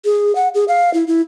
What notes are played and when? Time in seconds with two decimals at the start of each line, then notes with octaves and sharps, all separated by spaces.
0.05 G#4
0.35 F#5
0.54 G#4
0.68 F5
0.94 E4
1.07 E4